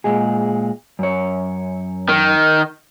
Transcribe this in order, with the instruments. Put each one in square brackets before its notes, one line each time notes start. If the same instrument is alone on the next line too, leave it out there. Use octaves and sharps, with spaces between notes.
[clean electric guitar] A#2 G#3 G#4
F#2 C#5
[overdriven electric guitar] D#3